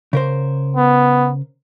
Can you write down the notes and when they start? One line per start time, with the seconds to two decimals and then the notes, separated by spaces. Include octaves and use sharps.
0.13 C#3 A#4 C5
0.77 B3